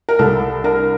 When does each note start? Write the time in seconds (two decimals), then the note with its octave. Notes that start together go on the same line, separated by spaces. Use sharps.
0.09 A#4
0.19 C2 A4
0.64 D4 A#4